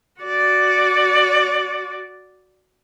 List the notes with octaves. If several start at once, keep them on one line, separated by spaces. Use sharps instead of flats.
F#4 D5